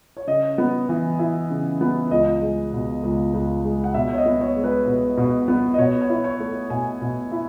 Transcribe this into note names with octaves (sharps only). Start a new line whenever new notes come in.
C#5
C#3 D#5
B3
E3
E4
C#3
B3
C#2 D#5
G#3
B2
C#2
C#2
G#3
F#5
B2 E5
C#5
D#5
B3
C#5
G#3
B4
B2
B2
B3
D#5
B2 C#5
C#5
E4
C#5
A3
B2 G#5
B2
E4